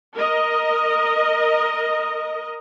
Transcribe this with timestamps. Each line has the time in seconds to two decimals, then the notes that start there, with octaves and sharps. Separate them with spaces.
0.16 A#4 D#5